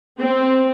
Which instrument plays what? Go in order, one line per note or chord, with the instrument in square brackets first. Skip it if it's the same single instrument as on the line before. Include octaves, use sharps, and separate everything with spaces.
[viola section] C4